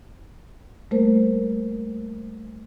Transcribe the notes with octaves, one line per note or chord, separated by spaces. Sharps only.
G3 A3 A#3 A#4 C5